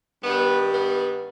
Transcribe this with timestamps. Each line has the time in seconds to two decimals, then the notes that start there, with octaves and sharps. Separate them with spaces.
0.23 G2 D#3 G3 B3
0.73 B3